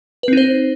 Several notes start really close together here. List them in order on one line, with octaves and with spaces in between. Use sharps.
B4 C4 D#4 C5